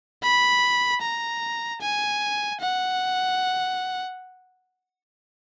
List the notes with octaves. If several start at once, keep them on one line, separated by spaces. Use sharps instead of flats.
B5
A#5
G#5
F#5